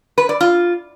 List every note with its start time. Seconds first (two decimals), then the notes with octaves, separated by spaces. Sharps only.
0.18 B4
0.29 D5
0.41 F4